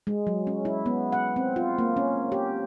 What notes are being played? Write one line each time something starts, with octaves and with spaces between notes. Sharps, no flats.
G#3
F#3
C#4
E4
B3
F#5
C4
F4
A#3
C#4
G4